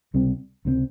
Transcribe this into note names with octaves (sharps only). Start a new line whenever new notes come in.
C#2 C3 G3 C4
C#2 C3 G3 C4